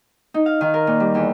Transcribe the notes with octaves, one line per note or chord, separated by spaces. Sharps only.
D#4
F5
D#3
A#4
A#2
G3
E2